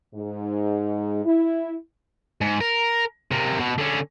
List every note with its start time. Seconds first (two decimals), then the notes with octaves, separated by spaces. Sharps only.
0.15 G#2
1.25 E4
2.41 G#2
2.61 A#4
3.31 C3 A#3
3.60 B2
3.78 D3 C#4